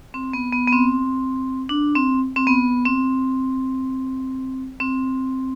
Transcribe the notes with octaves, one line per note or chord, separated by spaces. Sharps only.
C4
B3
B3
B3
C4
D4
C4
C4
B3
C4
C4